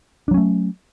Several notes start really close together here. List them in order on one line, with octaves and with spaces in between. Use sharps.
D4 F#3 C#4 A3